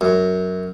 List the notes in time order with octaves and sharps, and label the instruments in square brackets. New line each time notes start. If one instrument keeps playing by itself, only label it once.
[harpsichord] F#2